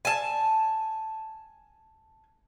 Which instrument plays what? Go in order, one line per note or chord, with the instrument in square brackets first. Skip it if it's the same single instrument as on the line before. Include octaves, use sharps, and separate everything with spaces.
[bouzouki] G#5 A5